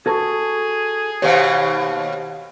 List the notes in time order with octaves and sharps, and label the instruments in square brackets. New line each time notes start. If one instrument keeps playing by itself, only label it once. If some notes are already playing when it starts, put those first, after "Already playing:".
[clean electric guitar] F#4 A4 A5 [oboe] G#4 [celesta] C#6 G#6
[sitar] D#2 B2 [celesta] G4 C5 [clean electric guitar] C#5 F5